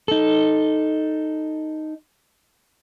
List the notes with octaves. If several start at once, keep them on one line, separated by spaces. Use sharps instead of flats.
D#4 A4